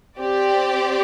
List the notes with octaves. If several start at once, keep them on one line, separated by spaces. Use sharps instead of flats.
C4 G4 D5